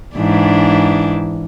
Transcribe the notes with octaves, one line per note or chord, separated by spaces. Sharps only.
G#2 E3 D4